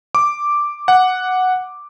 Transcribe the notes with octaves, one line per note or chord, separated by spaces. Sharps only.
D6
F#5